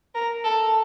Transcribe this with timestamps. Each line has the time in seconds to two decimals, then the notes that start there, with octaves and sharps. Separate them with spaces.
0.15 A#4
0.44 A4